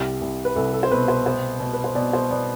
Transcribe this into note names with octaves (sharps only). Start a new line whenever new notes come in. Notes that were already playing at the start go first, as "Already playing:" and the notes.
Already playing: C2 G4
C2
B4
C2 A4
A4
C5
B2 B4
C5
B3 C5
B2
B4
C5
B2 D5
C5
B3 D5